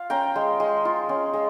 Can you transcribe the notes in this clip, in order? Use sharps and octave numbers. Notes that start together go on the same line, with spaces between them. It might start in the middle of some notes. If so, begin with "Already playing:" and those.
Already playing: F4 F5
C#4 G5 A#5
G#3
G#3
F4
C#4
G#3